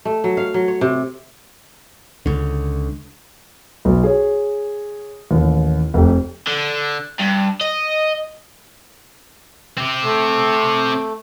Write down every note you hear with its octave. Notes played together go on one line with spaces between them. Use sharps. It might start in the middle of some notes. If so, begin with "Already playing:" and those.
A3
F#3
F5
F#3
C#5
C3
C#2 D3
B1
G#4 C#5
A1 D#2
F1 G4
D3
G2
D#5
C4 G4
A3